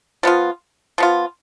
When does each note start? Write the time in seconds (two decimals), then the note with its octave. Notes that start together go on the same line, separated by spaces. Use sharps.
0.23 F3 B3 F4
0.98 F3 B3 F4